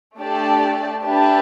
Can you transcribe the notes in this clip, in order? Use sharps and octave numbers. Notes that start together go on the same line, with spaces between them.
A3 D4 G4 D5 A5
D4 G4 B4 E5 A5